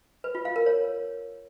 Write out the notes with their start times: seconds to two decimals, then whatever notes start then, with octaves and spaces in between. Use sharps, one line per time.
0.24 B4
0.35 F4
0.45 F5
0.56 A#4
0.66 C#5